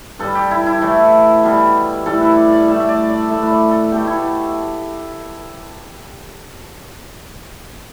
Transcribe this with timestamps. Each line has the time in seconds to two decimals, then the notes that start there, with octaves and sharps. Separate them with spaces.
0.19 G2 G3 A4
0.35 G4
0.51 E4
0.66 E4
0.81 A2 E3 A3
1.44 B2 G3
2.06 A2 E3 G3 A4
2.21 B4
2.37 D5
2.52 D5
2.68 A2 A3 E5
2.80 E5
2.89 D5
3.09 D5
3.30 A2 A3 E5
3.43 B4
3.51 D5
3.71 A4
3.92 B2 A3 G4
4.07 E4